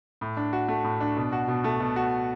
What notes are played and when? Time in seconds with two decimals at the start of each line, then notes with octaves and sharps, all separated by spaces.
0.21 A2
0.37 D4
0.53 F#4
0.68 A3
0.84 A2
1.00 D4
1.17 B2
1.32 F#4
1.48 B2
1.64 A3
1.80 B2
1.96 F#4